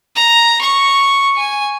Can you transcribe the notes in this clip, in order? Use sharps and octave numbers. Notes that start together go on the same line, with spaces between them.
A#5
C#6
G#5